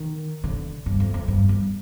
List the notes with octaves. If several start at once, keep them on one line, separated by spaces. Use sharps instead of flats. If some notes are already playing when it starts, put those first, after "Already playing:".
Already playing: D#3
D3
G2
F2
F2
G2
G2